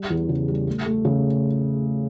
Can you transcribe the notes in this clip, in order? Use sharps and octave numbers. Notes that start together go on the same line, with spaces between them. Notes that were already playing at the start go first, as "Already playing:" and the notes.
Already playing: G3
E2
C#3
G3
A3
A3
C#3